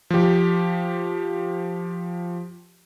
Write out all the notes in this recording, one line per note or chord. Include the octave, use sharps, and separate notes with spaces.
F3 G4